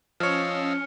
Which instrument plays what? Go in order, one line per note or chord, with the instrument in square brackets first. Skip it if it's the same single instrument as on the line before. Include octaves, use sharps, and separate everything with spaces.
[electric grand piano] F3 C#5 [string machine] C#4 [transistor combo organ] D#5 F5 E6 [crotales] F6 C#7